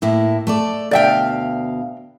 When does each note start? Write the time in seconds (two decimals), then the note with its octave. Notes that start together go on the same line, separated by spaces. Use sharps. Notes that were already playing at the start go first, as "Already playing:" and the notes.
0.02 A2 A#3 E4
0.47 A3 A4 D5
0.91 D2 B2 D5 E5 F5 G5